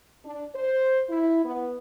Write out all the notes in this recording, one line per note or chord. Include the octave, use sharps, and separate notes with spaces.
D4
C5
E4
B3